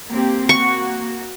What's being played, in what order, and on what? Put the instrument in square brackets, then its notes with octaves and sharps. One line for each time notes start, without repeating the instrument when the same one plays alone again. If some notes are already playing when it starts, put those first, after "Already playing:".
[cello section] A#3 C4 G4
[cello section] A#3 F#4 [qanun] C#6